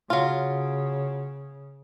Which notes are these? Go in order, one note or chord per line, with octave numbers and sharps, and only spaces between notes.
C#3 F#3 F4